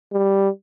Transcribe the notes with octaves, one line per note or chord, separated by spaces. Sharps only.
G3